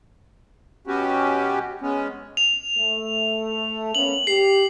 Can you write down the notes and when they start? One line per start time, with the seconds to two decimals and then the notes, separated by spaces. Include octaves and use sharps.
0.87 B2 B3 C#4 F#4 G4
1.82 G#3 B3 C#4
2.37 F7
2.78 A3
3.95 A#3 B3 C#4 F#7
4.27 G4 C7